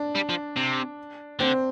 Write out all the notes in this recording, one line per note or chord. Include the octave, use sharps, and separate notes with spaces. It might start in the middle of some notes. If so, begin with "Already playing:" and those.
Already playing: D4
G3
F3
C3
D3 C4